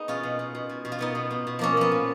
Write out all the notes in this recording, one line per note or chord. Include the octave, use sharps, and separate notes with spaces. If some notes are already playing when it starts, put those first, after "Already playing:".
Already playing: B3 D#4 G#4
B2 C#4 F4
B2
B2
B2
B2
B2
F4
B2 B3 D#4
B2
B2
B2
F3 A#3 C#4
F3 B3
A#2